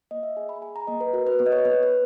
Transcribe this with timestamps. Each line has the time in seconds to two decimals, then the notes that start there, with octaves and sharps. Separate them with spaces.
0.11 A#3 D#5
0.23 E5
0.37 G#4 G#5
0.49 B5
0.62 G#4 G#5
0.76 A#5
0.87 A#3 D#5
1.00 B4
1.13 F#4 A#4
1.27 B4
1.39 B3 B4
1.46 D#5
1.52 C#5
1.65 B3 B4
1.83 B4